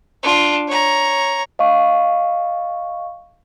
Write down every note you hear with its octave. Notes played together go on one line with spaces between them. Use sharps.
D4 F4
C#5 A#5
D#5 F5 C#6